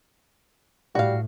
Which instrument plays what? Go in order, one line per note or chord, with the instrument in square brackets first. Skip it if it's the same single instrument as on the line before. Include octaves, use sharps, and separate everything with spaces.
[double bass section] A2 [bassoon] G3 [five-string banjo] F#4 F5